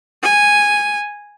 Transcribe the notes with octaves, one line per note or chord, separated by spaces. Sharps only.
G#5